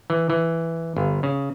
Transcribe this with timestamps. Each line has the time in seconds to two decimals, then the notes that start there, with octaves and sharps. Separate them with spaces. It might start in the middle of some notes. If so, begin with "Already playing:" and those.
0.10 E3
0.30 E3
0.97 G1
1.23 C#3